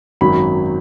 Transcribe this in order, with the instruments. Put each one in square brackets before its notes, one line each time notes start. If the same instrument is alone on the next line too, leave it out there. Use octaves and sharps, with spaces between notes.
[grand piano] G#1 F#2 D#3 F#3 B5